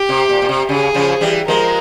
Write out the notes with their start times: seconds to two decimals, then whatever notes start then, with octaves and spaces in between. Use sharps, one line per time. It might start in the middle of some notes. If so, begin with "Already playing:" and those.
Already playing: G4
0.09 C3
0.29 A#2
0.42 A#2
0.49 C3
0.69 C#3 G#4
0.94 C#3 F3
1.21 E3 G3
1.47 F3 G#3 A#4